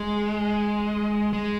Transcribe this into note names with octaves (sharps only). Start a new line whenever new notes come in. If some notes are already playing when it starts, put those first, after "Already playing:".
Already playing: G#3
G#3